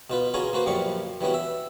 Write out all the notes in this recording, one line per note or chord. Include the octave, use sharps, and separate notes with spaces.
B2 F4 B4
C#4 F4 F#4 G#4 G#5 A#5
A#3 F#4 B4 C5
F#2 A#2 F3 G3 F5 C#6
E3 G3 B3 C#4 F#4
E5